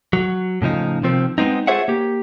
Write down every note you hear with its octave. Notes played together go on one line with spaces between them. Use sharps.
F#3
A2 C#3 F3 D#4
C3 D#3 F3 C4
G#3 B3 C4 D#4
F4 G#4 C5 C#5 E5 F#5
A#3 G4